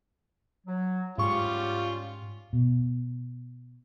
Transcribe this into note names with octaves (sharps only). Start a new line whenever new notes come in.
F#3
G#2 G3 C#4 F4 G4 C#6
B2